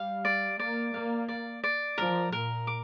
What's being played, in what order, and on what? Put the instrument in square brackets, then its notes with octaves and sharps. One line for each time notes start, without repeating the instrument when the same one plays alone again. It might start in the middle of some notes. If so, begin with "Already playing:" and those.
Already playing: [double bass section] G3 [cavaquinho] F5
[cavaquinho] D5
[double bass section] A#3 [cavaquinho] D5
[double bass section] A#3 [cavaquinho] F5
[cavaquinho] D5
D5
[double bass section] F3 [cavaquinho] A#4
[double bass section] A#2 [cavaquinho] A#4
[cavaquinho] D6